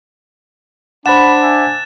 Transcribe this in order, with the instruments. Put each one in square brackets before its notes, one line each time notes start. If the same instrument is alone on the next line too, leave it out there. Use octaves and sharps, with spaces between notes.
[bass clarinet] D4 [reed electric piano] C5 F#5 [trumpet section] B5 [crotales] F#6 A6 E7
[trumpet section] E5 G#5